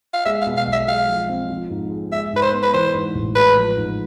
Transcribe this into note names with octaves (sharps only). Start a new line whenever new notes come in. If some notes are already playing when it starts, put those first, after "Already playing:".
F5
G#3 E5
F5
B2
F5
B1
E5
G#3 F5
F3
C4
F3
G#2
G#3
G#3 E5
G#2 B4
C5
B3
B4
E3 C5
G#2
A1
G#3 B4
F3
G#2